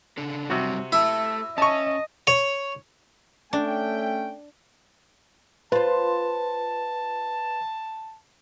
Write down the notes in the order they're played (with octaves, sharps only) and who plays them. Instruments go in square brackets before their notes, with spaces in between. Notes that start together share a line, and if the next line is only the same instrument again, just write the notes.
[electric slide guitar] C#3 D4 A4
[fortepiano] C3 F#4 [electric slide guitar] F#3 G3 C4
[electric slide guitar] A3 A4 [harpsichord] E4
[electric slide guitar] C#4 [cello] D#5 [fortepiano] A5 C#6
[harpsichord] C#5
[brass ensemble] A3 C#4 G5 [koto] D4
[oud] F4 C5 [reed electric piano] B4 [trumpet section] A5